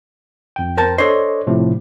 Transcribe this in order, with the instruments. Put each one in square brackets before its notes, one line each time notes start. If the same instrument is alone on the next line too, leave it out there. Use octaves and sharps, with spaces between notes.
[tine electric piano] F2 G5
[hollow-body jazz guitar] A#4 C5 A5
[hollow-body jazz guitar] D4 C5 [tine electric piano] A4 C#5 D#5
[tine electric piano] A2 C3 F3